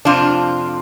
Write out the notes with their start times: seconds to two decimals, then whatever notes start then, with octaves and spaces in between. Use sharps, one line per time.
0.05 F2 C3 F3 D4 F4